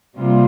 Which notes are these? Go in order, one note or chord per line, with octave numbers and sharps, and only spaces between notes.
C3 G3 A#3 F4